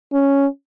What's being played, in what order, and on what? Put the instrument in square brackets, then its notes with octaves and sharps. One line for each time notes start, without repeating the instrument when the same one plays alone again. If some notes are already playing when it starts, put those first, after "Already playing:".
[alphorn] C#4